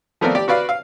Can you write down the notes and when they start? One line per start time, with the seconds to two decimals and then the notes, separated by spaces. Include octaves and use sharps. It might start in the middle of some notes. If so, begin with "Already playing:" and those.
0.21 F3 A3 B3 C4 A#4 D5
0.35 G4 D5
0.48 F#4 B4 D5 F5
0.69 F5